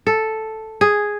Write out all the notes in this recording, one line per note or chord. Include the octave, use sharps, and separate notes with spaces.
A4
G#4